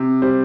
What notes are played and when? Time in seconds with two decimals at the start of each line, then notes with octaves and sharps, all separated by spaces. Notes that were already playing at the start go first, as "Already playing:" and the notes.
Already playing: C3
0.22 G3 C5